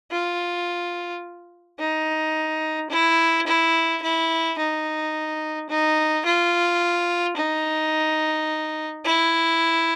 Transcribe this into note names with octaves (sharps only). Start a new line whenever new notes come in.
F4
D#4
E4
E4
E4
D#4
D#4
F4
D#4
E4